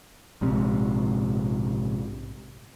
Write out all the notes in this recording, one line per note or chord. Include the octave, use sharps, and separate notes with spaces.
A#1 G#2 C3